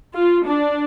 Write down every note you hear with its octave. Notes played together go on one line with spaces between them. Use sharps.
F4
D4